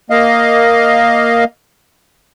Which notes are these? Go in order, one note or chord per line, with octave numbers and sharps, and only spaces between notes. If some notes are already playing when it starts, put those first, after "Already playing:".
A#3 D#5 F5